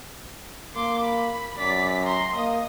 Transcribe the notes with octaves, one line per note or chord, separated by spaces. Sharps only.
A#3 C6 D6
B5
F#2 D5 B6
A#5 C6
A#3 D#5 D#6